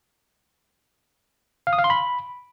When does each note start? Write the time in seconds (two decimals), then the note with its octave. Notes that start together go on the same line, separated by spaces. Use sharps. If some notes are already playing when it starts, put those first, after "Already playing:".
1.67 F5
1.73 D#6
1.78 F5
1.84 C6
1.90 B5